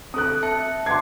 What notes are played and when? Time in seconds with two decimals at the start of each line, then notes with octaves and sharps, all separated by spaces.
0.14 C4 A4 D#6 F#6
0.43 E5 A5 C#7
0.86 C6 D6 G#6 C7